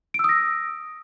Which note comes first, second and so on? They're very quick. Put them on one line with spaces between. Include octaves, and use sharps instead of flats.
D7 E6 D#6 A#6